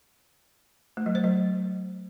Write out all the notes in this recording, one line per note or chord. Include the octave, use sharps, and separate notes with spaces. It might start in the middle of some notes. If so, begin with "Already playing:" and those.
A3
F#3
C5
F#3